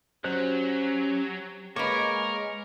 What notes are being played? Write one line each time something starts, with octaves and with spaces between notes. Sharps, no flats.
F#3 C#4 G4 C5 F#6
G#3 A#3 A#4 B4 C#5